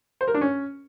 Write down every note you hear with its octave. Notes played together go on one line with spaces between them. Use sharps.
C5
A#4
D4
C#4